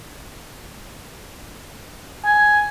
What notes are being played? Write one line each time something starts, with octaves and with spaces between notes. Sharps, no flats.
G#5